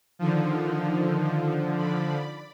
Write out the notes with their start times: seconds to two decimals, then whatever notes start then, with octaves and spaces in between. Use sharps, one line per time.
0.19 D3 D#3 F3 D#4
1.75 D5 B5